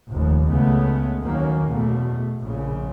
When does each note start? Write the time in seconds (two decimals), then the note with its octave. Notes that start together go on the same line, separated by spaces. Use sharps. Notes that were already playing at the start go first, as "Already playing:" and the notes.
0.11 F1 D#2
0.49 C#2 C#3 G#3 A3 B3
1.23 D#2 D#3 F#3 A#3 C#4
1.67 E2 B2 A3
2.41 A#1 A#2 C#3